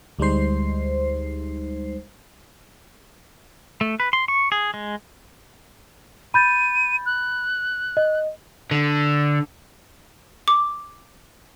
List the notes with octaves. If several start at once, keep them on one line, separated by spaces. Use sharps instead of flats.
D2 G3 G#3 D#4 C5 C7
A3
B4
C6
C#6
G#4
G#3
B5 G6 A6 D#7
F#6
D#5
D3
D6